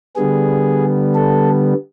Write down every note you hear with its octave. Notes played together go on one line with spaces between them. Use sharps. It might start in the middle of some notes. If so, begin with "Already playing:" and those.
D3 G3 B3 G#4
A4